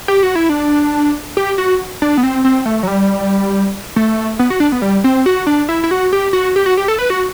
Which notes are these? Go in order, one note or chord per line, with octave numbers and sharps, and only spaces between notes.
G4
F#4
E4
D4
G4
F#4
D4
B3
C4
C4
A3
F#3
G3
A3
B3
F#4
D4
B3
G3
C4
F#4
D4
E4
E4
F#4
G4
F#4
G4
F#4
G4
A4
B4
F#4